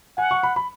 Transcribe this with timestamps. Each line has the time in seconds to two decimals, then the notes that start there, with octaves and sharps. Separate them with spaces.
0.17 F#5 G#5
0.31 C#6
0.43 B5
0.56 B5